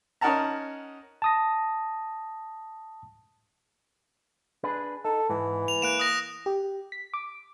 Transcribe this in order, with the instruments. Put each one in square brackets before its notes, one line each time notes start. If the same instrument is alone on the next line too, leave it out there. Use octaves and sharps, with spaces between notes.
[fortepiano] C#4 D#4 A#4 F#5 A5 A#5
[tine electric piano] A5 D#6 A#6
[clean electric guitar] D4 G#4 B4
[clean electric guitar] D#4 [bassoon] A4
[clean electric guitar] G#2 [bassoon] E3
[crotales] F7
[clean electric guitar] A#3 [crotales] F#6 D7 E7
[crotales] D#6 A#6
[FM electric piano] G4
B6
D6